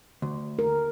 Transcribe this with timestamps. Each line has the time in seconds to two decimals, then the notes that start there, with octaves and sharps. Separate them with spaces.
0.22 D2
0.59 A#4